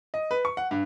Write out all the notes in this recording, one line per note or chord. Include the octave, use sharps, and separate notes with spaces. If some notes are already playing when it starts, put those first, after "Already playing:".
D#5
B4
C#6
F#5
G2